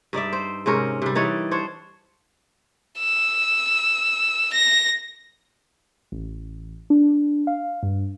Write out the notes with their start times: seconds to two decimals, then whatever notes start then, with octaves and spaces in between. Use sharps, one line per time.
0.13 G2 D#4 D5 E5
0.33 C5
0.66 G#2 C3 C#4 A#4
1.02 C3 G3
1.15 E3 D#4 C#5 D5
1.51 D4 C5 C#5
2.99 E6
4.53 A#6
6.12 A1
6.90 D4
7.47 F5
7.83 G2